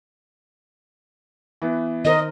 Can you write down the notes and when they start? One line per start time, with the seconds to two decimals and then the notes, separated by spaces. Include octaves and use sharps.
1.62 E3 B3
2.05 D#3 A#4 C5 D#5